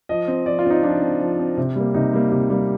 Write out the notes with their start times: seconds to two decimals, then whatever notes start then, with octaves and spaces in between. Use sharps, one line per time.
0.09 F3 D#5
0.28 C4
0.46 F3 D5
0.59 F4
0.65 C4
0.70 D#4
0.83 F3 D4
1.01 C4
1.20 F3
1.39 C4
1.57 C3
1.76 G3 A#3
1.94 C3 D#4
2.13 G3 A#3
2.32 C3
2.50 G3 A#3